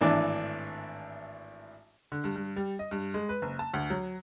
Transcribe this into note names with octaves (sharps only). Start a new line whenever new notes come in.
G#1 A2 E3 D4 D6
D3
G2
G2
G3
D#5
G2
G#3
B4
F#1
A5
D2
F#3